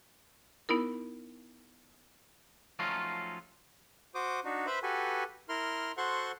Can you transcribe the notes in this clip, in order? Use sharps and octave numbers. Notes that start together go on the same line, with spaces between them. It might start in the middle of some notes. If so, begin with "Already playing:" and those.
B3 D#4 E4 A#4
F3 F#3 A3 C#4 D#4 F4
F#4 C5 D6 D#6
D4 D#4 F#4
B4 C5 E5 B5
F#4 G4 A4 B4 G#5
E4 A#4 C6 F6
F#4 A4 C5 F#5 C6 C#6